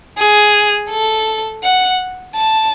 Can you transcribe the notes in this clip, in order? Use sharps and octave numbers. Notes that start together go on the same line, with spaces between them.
G#4
A4
F#5
A5